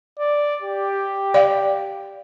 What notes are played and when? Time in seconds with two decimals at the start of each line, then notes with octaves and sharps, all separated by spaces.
0.19 D5
0.62 G4
1.34 D5 F5